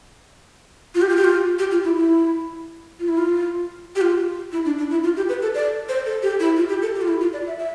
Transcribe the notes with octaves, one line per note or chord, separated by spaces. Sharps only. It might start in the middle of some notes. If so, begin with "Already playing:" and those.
F4
G4
F4
G4
F4
G4
F4
E4
E4
F4
E4
F4
G4
F4
E4
D4
D4
E4
F4
G4
B4
A4
D5
C5
A4
G4
E4
F4
G4
A4
G4
F4
E4
F4
D5
E5
E5